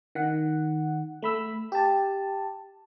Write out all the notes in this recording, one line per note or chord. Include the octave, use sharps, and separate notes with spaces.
D#3 F#5
A3 B5 E6
G4 A5